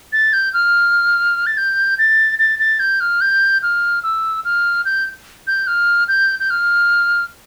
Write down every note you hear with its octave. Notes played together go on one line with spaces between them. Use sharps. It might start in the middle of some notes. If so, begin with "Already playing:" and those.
A6
G6
F6
A6
G6
A6
A6
A6
G6
F6
G6
F6
E6
F6
G6
G6
F6
G6
G6
F6